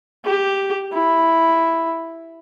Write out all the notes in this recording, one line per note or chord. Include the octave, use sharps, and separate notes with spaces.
G4
E4